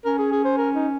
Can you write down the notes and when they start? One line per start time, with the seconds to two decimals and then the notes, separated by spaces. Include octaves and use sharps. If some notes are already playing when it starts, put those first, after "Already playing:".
0.05 C#4 A#4
0.18 G#4
0.32 G#4
0.44 C5
0.58 A#4
0.75 D#4